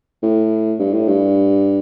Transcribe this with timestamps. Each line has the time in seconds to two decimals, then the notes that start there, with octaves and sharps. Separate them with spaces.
0.23 A2
0.79 G2
0.93 A2
1.08 G2